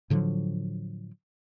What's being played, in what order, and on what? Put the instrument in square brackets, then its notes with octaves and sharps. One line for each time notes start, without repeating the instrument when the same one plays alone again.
[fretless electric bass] A2 D3 F3 F#3